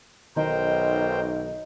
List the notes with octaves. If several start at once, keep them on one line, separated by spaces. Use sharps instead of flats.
B1 D#3 D#4 A#4 C5 G5